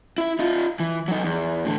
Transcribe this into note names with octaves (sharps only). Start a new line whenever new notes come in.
E4 E5
D#4 F4
E3
F#3 D#4
E2
A2 D3